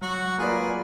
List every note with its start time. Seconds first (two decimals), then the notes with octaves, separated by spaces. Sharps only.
0.01 F#3 F#4
0.38 A#3 F4 G#4 B4 D5